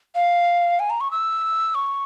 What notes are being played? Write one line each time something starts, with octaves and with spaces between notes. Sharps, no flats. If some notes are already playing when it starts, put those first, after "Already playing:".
F5
G#5
A#5
C#6
E6
C#6